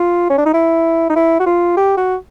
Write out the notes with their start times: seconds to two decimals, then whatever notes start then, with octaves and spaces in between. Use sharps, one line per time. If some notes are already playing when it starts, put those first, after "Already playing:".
Already playing: F4
0.30 C#4
0.38 D4
0.46 D#4
0.54 E4
1.10 D#4
1.16 E4
1.40 F#4
1.46 F4
1.77 G4
1.97 F#4